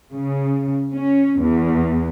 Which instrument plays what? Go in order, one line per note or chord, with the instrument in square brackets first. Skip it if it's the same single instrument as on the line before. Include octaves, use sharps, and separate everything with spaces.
[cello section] C#3
C#4
E2